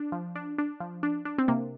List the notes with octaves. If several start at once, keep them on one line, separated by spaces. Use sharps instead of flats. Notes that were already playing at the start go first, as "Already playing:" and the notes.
Already playing: D4
F3
D4
D4
F3
D4
D4
C4
C3 A#3